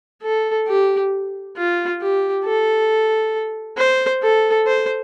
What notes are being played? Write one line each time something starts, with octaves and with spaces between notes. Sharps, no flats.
A4
G4
F4
G4
A4
C5
A4
C5